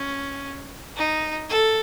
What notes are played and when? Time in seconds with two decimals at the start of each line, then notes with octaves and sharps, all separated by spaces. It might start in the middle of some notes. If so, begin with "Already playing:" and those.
Already playing: C#4
0.96 D#4
1.50 A4